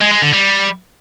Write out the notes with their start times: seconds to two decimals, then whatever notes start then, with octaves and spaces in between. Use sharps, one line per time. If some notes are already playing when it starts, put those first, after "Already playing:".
0.01 G#3
0.12 G#3
0.22 D3
0.33 G3